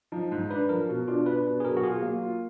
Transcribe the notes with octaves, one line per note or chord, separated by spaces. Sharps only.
F3 D#4
G#2
D4 B4
F3 A#4
B2
D4 F4
D4 B4
B2
G#4
F#3 A#4
F#4
F4 G#4
F#3 A#3
F4